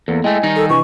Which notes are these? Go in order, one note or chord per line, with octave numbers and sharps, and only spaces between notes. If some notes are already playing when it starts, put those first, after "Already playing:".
E2 A#3 B3 A4
G#3 A3 E4 D#5 G5 G#5
D#3 G3 D#4
A4
C3 E3 D4 C#6